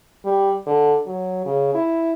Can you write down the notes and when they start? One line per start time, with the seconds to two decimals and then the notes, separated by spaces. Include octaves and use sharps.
0.25 G3
0.67 D3
1.07 F#3
1.45 C#3
1.74 E4